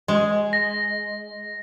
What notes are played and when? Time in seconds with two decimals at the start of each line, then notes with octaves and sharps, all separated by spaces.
0.08 G#3
0.53 A#6